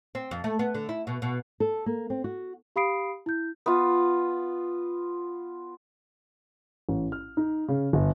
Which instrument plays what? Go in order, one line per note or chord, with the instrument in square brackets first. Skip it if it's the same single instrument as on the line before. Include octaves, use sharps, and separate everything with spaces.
[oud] C4
F2
A3
B3
D3
E4
B2
B2
[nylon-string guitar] A4
A#3
C4
F#4
[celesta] G4 F5 B5 D#6 C7 D7
E4 G6
[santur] B3 F4
[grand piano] A1
F6
D#4
C#3
G1